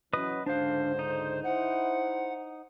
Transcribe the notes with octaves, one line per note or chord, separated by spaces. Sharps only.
E3 F#3 C#4 B4 D#5 D#6
C#2 G#2 D3 D4 C5 F5
D#4
E4 C5 F#5